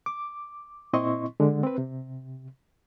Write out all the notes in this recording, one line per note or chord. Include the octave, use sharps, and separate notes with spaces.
D6
A#2 C4 E4 D#5 C6 C#6
D3 G#3
C4 B4
C3